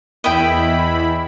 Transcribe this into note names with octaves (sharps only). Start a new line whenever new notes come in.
E2 E4 D#5 E5 G5 B5